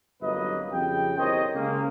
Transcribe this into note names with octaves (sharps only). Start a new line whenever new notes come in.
G1 C2 F#3 A#3 B4 D#5
F2 C#3 G4 G5
G1 C2 A#4 C5 C#5 D#5
C#3 G#3 A#3